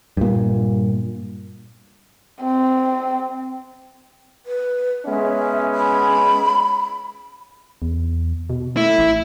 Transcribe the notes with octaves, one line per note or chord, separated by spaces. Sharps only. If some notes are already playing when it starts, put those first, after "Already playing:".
G2 A#2
C4
B4
G#3 B3 C#4 E5
B5
E2
B2
A3 E4
A1